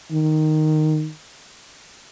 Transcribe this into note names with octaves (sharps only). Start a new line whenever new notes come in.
D#3